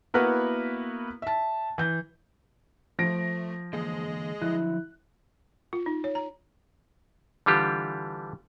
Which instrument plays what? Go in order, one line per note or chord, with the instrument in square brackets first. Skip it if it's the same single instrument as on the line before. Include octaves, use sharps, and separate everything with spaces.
[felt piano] A#3 B3 E4 F#4 A#4 B4
E5 A5
E3 G6
[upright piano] F3 A#6 D7 [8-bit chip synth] A3
[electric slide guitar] D3 E3 A#3 [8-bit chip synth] G#3 G#4 D#5
[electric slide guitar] D3 F3 F#3 [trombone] E4 [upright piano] F#6
[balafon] F4
D#4
C#5
A#5
[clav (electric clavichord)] D3 E3 G3 F4 G4